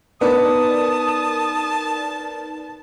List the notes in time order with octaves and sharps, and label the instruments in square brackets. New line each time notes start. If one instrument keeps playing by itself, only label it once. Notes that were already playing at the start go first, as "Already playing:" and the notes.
[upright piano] B3 [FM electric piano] D#4 A#4 D5 [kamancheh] A5 [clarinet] D#6